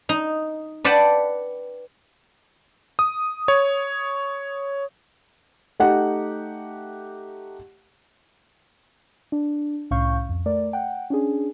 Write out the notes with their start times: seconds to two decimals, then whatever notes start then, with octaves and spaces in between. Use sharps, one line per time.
0.09 D#4
0.85 B4 D5 F#5 G5 A5
2.99 D#6
3.48 C#5
5.80 A3 D#4 G4 F#5
9.32 D4
9.91 C2 A2 C#4 F5 C#6 G6
10.29 F2
10.46 A3 A#4 D5
10.73 F#5 G5
11.10 C#4 D4 G#4